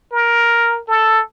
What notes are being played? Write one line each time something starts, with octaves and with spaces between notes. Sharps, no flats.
A#4
A4